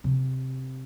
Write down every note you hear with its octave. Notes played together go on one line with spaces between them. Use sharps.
C3